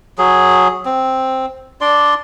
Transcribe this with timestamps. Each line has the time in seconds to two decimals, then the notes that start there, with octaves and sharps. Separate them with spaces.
0.18 F#3 G#4
0.85 C4
1.81 D4 D5 C6